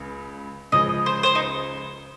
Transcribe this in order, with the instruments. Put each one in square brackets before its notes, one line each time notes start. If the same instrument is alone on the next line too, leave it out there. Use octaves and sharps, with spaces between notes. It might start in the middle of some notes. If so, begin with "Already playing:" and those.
Already playing: [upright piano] C#2 C#3
[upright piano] C#2 C#3 F3 [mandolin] D#5
[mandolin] C5
C5
D#4